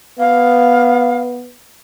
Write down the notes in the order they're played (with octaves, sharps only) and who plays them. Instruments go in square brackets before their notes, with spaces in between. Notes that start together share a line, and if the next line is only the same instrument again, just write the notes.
[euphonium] B3 [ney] F5